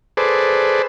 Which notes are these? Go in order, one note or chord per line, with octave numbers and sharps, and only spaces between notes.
G#4 A4 B4 C5 D5